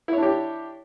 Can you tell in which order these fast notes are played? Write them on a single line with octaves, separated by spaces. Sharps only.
E4 C#5 D4 G4